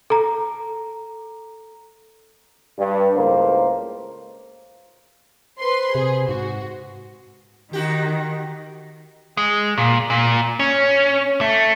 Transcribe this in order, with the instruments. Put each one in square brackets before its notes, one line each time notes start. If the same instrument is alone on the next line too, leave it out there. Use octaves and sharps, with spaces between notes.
[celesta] A4 A#5
[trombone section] G2
C#2 A2 A#3 A#4 C5
[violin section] B4 C6 [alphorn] C5
[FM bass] C3 [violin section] G#4
[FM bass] G#2 [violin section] F#4
[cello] D#3 [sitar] D#4 F#4 G4
[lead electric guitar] G#3
A#2
A#2
C#4
A3